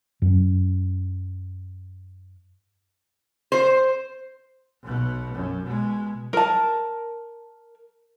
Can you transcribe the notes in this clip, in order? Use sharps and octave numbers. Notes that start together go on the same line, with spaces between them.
F#2 C#4
C5
B1 B2
F#2
B2 G#3
A#4 A5